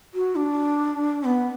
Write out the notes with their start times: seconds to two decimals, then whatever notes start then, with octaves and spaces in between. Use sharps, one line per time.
0.14 F#4
0.36 D4
1.24 B3